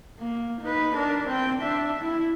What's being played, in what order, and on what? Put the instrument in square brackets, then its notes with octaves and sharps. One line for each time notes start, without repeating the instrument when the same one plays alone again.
[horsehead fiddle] A#3
D#4 B4
D4 A#4
C4 G5
D4 E5
E4